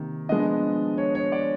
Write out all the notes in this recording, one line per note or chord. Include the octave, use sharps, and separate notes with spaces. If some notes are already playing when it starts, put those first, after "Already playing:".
Already playing: C3 D#3 A#3
F3 G#3 B3 D4 D#5
C#5
C#5
D5